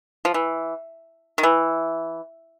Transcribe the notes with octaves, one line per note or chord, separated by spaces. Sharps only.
F3
E3
D#3
E3